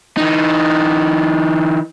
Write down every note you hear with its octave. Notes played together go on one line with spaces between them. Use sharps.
E3 D#4